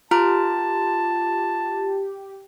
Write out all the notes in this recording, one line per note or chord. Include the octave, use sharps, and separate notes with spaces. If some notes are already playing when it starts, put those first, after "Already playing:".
F4 G4 A#4 A5